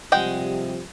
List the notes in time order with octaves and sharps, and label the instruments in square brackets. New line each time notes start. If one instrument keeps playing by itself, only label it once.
[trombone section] C3 F3 G3 [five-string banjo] G#3 F#5 G5